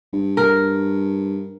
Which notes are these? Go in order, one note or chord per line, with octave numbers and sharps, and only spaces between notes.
G2
A#4